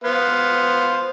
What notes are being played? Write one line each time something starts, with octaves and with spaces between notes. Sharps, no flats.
B3 C5 F5